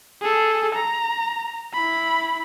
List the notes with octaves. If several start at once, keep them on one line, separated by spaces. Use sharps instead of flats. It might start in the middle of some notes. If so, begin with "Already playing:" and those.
G#4 A4
A#5
E4 B5